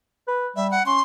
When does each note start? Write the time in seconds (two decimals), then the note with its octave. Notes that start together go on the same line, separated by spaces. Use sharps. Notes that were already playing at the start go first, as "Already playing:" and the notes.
0.28 B4
0.56 G3 E5
0.71 F#5
0.86 C#4 C6